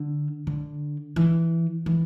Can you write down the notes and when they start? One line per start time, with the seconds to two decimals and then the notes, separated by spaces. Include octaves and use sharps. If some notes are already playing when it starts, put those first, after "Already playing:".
Already playing: D3
0.47 D3
1.16 E3
1.86 E3